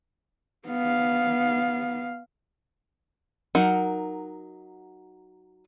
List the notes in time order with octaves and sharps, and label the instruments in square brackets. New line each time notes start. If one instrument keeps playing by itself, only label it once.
[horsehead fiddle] B3 F5
[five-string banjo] F#3 D#4 A#4 F#5